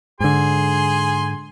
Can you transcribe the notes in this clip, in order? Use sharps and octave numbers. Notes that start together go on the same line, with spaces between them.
G#2 D3 G#4 G#5 C6